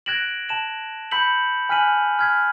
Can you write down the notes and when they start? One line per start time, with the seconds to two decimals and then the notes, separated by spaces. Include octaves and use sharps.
0.06 F#6 G#6 A#6 D7 E7 F#7
0.49 A5 E7 F#7
1.11 B5 E6 G6 B6 C#7 F#7
1.69 G#5 F6 F#6 B6 D#7 F#7
2.19 F6 G#6 B6